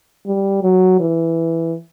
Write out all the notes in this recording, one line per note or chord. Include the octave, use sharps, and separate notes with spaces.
G3
F#3
E3